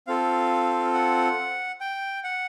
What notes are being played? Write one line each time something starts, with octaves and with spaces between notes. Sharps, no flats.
C4 F4 A4 F5
F#5
G5
F#5